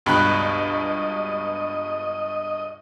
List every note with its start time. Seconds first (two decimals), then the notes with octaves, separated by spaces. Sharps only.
0.06 C#2 G2 B2 D#5 G5 B5 F#6